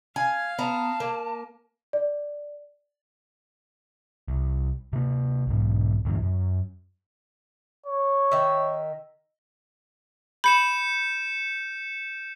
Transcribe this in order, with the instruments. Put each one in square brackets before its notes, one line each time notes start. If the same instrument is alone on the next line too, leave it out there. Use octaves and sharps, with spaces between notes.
[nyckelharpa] F5 [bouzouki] G#5
[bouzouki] B3 A#5 [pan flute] A5
[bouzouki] A#3
[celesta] D5
[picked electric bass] C2
C3 A#3
B1 G#2
D2 G2 A#2 E3
F#2
[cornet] C#5
[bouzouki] D#3 E5
[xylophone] B5 [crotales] G6 C#7 E7